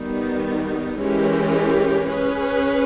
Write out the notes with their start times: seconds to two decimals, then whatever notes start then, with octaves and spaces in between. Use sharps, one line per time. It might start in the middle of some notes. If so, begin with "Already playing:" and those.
Already playing: D#3 G3 B3 D#4
1.00 E3 G#3 C#4 G4 A#4
2.09 C#4 G#4 B4